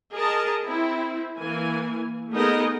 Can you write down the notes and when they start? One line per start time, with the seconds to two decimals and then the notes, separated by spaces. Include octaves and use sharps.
0.14 G#4 A#4 D#5 A5 A#5
0.66 C4 E4
1.38 E3 A#3 G#5
2.31 A3 B3 D#4 G#4 A#4 D#5